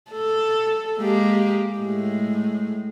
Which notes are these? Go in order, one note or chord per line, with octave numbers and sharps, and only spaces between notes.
A4
G#3 A#3 G4
A2 G#3